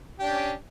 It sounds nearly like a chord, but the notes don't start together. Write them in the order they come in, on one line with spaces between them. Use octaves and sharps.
G4 D4 C#4